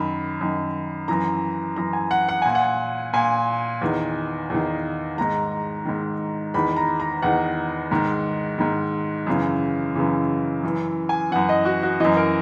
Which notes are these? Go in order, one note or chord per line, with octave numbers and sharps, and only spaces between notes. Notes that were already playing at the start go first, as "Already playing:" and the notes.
Already playing: F#2 D#3 B5
F#2 D#3
F#2 E3 A#5
F#2 E3 A#5
G#5
F#5
F#5
A#2 G#5
F#5
A#2 G#5
E2 D#3
E2 D#3
G#2 D#3 A#5
G#2 D#3
E2 D#3 B5
A#5
A#5
E2 D#3 F#5
G#2 D#3
G#2 D#3
F#2 C#3 E3
F#2 C#3 E3
F#2 E3
G#5
F#2 E3 F#5
D#5
F#4
F#4
F#2 E3 D#5
A#4